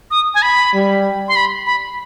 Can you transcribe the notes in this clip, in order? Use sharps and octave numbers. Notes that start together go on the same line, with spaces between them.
D#6
G#5
B5
G3
C6
B5
B5